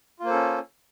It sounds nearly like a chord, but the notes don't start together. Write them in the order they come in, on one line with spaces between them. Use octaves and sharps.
F4 A#3 C5 A4 C#4